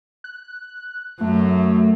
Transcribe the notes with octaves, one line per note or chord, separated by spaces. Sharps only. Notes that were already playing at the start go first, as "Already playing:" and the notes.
F#6
F#2 F#3 A3